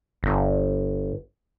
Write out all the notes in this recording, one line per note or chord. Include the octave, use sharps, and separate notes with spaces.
G1